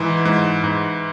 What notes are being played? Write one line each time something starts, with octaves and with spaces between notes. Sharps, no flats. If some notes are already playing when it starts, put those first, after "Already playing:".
Already playing: G#2 E3
G#2
G#2